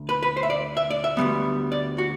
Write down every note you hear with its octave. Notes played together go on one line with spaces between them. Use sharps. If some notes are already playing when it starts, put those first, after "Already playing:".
Already playing: D2
B4
B4
C5
E5
D5
E5
D5
E5
D2 C3 G3 B3
D5
F#4